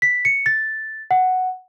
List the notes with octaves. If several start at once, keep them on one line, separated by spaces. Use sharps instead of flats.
B6
C#7
A6
F#5